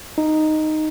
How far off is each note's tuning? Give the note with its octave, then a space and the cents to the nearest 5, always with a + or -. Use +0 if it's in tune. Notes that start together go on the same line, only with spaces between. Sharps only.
D#4 -5